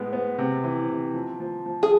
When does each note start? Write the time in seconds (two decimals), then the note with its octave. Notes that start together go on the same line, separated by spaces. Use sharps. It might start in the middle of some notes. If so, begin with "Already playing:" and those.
Already playing: A2 G#3 B3
0.13 B3
0.38 C3
0.64 E3
0.89 C3
1.14 F3
1.40 F3
1.66 F3
1.83 G#4